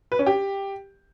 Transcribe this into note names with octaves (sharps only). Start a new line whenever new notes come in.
B4
C#4
G4